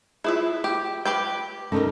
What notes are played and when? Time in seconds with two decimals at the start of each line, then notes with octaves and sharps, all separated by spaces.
0.24 E4 F4 G#4 B4 E5
0.64 G4
1.05 G4 B4 G5
1.72 A3 C#4 D#4 A#4